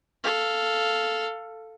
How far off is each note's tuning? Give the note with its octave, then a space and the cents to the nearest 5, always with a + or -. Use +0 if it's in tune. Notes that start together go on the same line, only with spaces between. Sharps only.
A4 +0 F5 +0